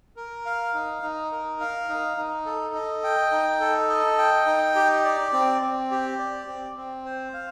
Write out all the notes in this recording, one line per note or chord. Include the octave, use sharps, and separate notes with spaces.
A#4
F5
D#4
D#4
A#4
F5
D#4
D#4
A4
D#5
G5
D#4
A4
D#5
G5
D#4
G4
D5
C4
C4
G4
D5
C4
C4
C5
F5